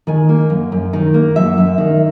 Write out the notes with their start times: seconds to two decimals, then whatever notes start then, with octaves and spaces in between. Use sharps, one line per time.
0.07 D#3 G#5
0.29 A#3
0.50 F#2
0.72 F#2
0.93 D#3
1.14 A#3
1.36 F#2 E5
1.58 F#2
1.78 D#3